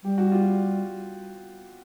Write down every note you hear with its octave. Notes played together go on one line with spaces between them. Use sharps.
G3 G4
F#4
F4 G4